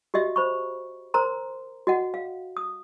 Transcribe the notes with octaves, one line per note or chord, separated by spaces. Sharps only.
F#4 G4 D#5 E5
C5 B5 C#6
A#4 C5 A#5 C6
F#4 D#5 F#5
F5
D#6